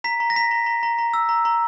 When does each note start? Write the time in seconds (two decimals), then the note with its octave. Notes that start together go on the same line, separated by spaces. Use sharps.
0.04 A#5 B6
0.20 A#5
0.30 A#6
0.36 A#5 B6
0.51 A#5
0.66 A#5
0.83 A#5
0.98 A#5
1.14 E6
1.29 A#5
1.45 A#5